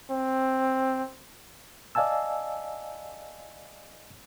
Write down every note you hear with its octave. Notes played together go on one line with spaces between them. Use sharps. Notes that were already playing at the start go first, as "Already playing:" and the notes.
C4
D5 D#5 F5 G#5 A5 E6